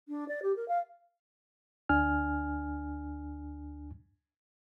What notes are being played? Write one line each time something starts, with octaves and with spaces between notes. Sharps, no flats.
D4
D5
G4
A#4
F5
D2 D4 G#5 F6